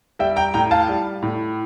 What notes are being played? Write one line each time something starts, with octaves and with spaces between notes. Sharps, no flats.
G3 E5 G5
G5 A#5
A2 G5 A#5
F5 A5
G3
A2